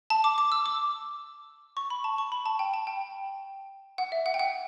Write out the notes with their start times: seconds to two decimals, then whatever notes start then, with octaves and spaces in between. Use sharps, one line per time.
0.10 A5
0.24 D6
0.38 D6
0.52 E6
0.66 D6
1.77 C#6
1.90 B5
2.04 A5
2.18 C#6
2.32 B5
2.46 A5
2.59 G5
2.74 A5
2.87 G5
3.98 F#5
4.12 E5
4.26 F#5
4.34 G5
4.39 F#5